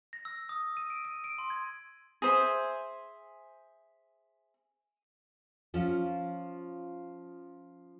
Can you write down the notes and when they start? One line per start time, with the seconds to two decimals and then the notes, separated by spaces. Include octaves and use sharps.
0.13 A#6
0.25 E6
0.49 D#6
0.77 D#7
0.90 D7
1.05 D#7
1.24 D7
1.38 C6
1.50 G#6
2.22 G#4 C5 E5
5.74 F3 C#4 F4